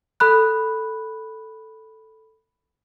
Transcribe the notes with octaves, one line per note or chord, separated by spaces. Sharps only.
A4 B5 F#6